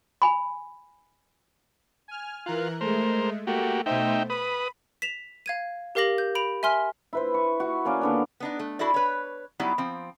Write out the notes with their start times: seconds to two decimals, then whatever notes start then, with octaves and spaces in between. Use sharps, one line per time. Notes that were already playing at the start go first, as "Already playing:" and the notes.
0.22 G#5 B5
2.08 G#5 F6
2.46 E3 F4 A#4 F#6
2.81 G#3 A3 A#4 C5
3.47 A3 A#3 F#4 G4
3.86 B2 A3 D#4 C5 E5 G5
4.30 B4 B5 D#6
5.02 B6 E7 F7
5.46 F5 G#6 D#7
5.95 G4 A#4 F5 D6 A#6 F#7
6.18 G6
6.35 B5 D7 F7
6.63 E5 G#5 C6 F6 G7
7.13 E4 B4 C5
7.34 C#6
7.60 F#4
7.85 A#3 C#4 D5 F5
8.01 D3 B3 D4
8.40 B3 D4 D#4
8.59 A3
8.79 D4 E4 F#4 A4 D5
8.94 B4 C#5
9.59 F#3 G3 B3 D#4 E4 D5
9.78 F3 C4